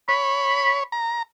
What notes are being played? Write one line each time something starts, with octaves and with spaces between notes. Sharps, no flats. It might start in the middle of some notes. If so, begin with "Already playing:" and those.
C#5 B5
A#5